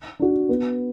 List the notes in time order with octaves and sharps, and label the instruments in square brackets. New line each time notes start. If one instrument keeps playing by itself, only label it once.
[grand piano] D4 F#4
B3